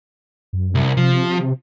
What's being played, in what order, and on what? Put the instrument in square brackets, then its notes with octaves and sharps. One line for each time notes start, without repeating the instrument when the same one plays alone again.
[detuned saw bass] F#2
[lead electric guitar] C2
[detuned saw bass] C3 [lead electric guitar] F3